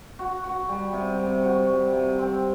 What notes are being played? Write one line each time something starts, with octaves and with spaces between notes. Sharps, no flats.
F#4
F#4
G3
C3
C3
F#4
G3
C3
C4